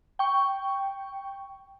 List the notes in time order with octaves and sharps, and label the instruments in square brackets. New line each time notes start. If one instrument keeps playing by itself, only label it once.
[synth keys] G5 C#6